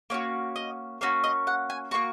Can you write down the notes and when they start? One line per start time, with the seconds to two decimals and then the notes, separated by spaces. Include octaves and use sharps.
0.10 A#3 C#4 F#4 C#5
0.56 D#5
1.01 A#3 C#4 F#4 C#5
1.24 D#5
1.47 F#5
1.70 G#5
1.91 A#3 D#4 F#4 C#6